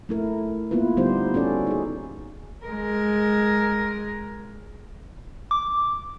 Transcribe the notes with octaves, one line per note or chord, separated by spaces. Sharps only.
A3 E4 A#4
A#3 B3 E4 F4 B4
D3 G3 B3 D#4 G4 C5
C#4 F#4 A4 D5
D#4 G#4
G#3 A#4
D6